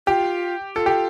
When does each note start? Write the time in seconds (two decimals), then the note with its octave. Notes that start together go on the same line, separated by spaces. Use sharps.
0.07 F4 G4
0.75 F4 A4
0.86 G4